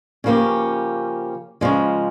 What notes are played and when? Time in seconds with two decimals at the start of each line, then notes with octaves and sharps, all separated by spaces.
0.24 C#3 F3 A#3 C#4 G4
1.61 C#3 F3 G#3